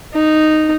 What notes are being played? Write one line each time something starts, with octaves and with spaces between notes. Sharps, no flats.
D#4